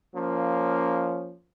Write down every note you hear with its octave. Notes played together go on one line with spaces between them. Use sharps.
F3 A#3 C#4